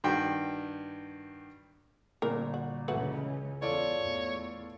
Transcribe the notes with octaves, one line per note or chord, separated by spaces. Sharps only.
G2 D#3 F#4 G5
G1 A#2 A#4
F#4
C#2 E3 A3 C#4 F#4 B4
E2 F4 A4 C#5 D5
E2 A2